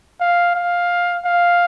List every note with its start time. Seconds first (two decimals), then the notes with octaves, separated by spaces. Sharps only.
0.21 F5
0.55 F5
1.25 F5